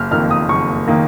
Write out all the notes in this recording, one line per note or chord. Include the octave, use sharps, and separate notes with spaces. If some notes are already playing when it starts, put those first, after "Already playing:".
Already playing: F#1 F6
F2 D#3 A#3 F6
D#6
F#1 C#6
D#3 A#3